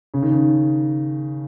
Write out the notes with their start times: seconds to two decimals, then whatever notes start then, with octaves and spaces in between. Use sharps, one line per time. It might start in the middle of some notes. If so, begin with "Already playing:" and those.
0.14 C#3
0.22 D#3
0.31 C#3